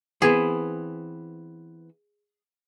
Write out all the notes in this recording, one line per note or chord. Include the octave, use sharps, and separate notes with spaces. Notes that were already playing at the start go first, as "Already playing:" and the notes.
E3 B3 C4 G#4